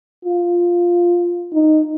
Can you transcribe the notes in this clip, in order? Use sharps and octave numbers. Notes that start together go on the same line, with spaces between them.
F4
D#4